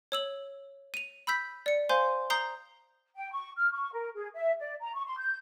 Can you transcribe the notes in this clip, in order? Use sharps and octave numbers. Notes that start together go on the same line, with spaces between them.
C#5 E6 F#7
D#7 F7
B5 E6 G6 B6
D5 C#7
C5 F5 G#5 C6 G6
A#5 D#6 G6 C7 G7
G5
C#6
F6
C#6
A#4
G#4
E5
D5
A#5
C#6
C6
G6